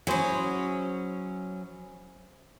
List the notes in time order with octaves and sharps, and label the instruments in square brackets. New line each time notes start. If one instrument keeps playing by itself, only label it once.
[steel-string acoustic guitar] F#3 C#4 [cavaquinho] E4 G#4 C5